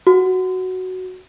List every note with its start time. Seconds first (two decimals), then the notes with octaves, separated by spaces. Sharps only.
0.07 F#4